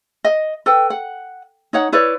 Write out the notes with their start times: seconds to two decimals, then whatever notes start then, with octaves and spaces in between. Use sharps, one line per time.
0.24 D#5
0.66 A4 B4 G5
0.90 F#5
1.73 D#4 C#5 F#5
1.92 E4 B4 C#5 D5